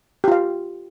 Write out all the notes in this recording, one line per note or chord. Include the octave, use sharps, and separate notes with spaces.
F4 G4 F5